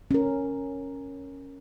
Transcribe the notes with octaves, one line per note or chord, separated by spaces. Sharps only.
C#4 A#4